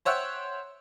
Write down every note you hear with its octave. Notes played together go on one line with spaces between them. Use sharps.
C5 C#5 E5 F#5 G5